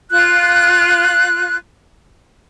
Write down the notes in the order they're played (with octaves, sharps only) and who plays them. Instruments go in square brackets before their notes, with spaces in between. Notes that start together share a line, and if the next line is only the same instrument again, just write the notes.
[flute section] F4 F#6